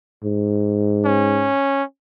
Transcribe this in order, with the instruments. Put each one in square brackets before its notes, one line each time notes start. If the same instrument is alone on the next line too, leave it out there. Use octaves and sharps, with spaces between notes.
[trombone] G#2
[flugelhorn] C#4